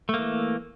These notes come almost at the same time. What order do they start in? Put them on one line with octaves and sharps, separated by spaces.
A3 A#3 E3